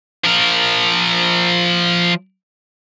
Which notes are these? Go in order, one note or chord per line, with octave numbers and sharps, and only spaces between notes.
F3 A#4